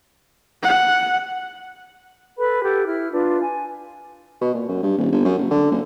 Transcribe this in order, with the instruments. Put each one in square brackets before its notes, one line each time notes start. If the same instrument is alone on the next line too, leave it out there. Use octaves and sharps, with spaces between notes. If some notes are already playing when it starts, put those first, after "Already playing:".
[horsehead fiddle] F#5
[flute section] A4 B4 B5
G4 A4 F#5
E4 F6
D4 F4 B4
G#5
[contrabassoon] B2
A#2
F#2
G2
D#1
G1
F#2
F#1
D3
F#1